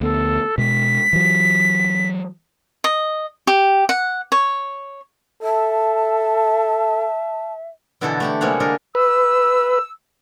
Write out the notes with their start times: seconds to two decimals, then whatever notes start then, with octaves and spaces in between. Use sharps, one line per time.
0.01 D2 B3 A4
0.58 B2 G#3 B6
1.13 E3 F#3
2.84 D#5
3.47 G4
3.89 F#5
4.32 C#5
5.43 A4 E5 A5
8.01 B2 D3 E3 E4 F#4 A4
8.20 A3 G4 F#5
8.41 C3 G3 G#3 A#3 C#5 F#5
8.60 D3 D4 G#4 A#4
8.95 B4 E6